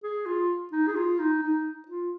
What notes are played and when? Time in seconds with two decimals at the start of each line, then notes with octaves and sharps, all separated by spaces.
0.03 G#4
0.26 F4
0.72 D#4
0.88 G#4
0.96 F4
1.19 D#4
1.42 D#4
1.88 F4